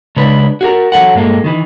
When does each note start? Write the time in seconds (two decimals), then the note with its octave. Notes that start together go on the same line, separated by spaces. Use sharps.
0.17 C#3 G#3 D4 B4
0.61 F#4 G#4 A#4
0.92 E2 F3 F#3 A4 F#5
1.15 G2 A#2 G#3 A#3 A4
1.44 D#3 E3